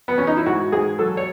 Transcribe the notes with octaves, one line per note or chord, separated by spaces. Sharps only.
B3
C#4
D#4
E4
G#2 F#4
G#2 G#4
F#3 A4
C#5